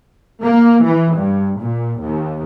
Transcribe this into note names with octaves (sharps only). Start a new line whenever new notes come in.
A#3
E3
G2
A#2
D#2